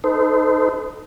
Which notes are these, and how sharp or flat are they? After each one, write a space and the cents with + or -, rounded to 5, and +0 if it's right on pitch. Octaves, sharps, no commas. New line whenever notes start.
D#4 +0 A4 +0 C5 -35